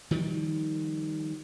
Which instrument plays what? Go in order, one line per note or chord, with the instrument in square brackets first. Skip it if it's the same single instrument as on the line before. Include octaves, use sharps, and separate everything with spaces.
[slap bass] D#3 F3 G3